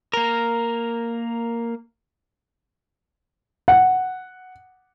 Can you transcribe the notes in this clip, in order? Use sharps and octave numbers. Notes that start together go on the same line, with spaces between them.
A#3 A#4
F#5